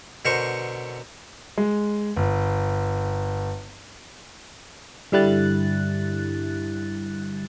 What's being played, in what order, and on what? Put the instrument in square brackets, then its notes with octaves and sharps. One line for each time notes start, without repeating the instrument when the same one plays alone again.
[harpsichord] B2 D3 A#4 C5 C#6
[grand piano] G#3
G1
[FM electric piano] G2 D3 G3 E4 F#6 A6